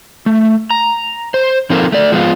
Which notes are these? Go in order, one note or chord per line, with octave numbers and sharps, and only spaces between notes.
A3
A#5
C5
F3 C4 D#4 F4 A4 A#4
A3 D5
F3 G#3 B3 D4 F4